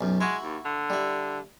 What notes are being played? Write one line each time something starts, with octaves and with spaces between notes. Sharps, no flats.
B1 F#2
G#3 E4 F#4
D#2
D3
G3 E4